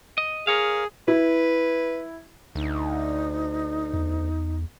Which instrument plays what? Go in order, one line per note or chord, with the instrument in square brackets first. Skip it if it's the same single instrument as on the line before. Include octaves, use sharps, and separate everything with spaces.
[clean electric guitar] D#5
[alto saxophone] G#4 [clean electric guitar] A#4 C#5 F5
[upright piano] E4 [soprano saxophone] B4
[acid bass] D2 [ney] D#4
[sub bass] E2